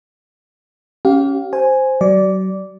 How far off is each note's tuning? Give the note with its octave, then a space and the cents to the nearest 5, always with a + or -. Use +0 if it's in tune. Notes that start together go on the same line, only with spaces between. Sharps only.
C#4 +0 G4 -30 F5 +15
C5 +0 G#5 +0
F#3 +35 D5 -10